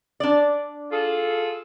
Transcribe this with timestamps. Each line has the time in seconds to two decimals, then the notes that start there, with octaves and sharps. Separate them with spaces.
0.20 D4 D5
0.92 F4 G#4 A4